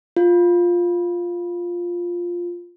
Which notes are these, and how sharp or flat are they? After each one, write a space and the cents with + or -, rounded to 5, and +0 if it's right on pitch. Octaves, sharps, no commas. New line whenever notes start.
F4 +5